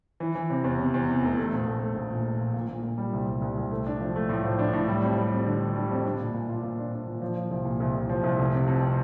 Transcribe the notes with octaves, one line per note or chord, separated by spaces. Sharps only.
E3
E3
C3
E2
C3
E2
C3
F1
A3
A#1
A3
A3
A#1
A#2
A#1
A#1
A#2
A#2
A#2
G3
C2
G3
C2
C2
A3
D4
F3
A3
A2
F3
D4
A2
G3
F2
G3
F2
D3
D3
G3
F2
D4
A#2
A#2
F4
A#2
D4
D4
A#2
F3
F3
C2
A#2
C2
C2
F3
C2
F1
C3
F2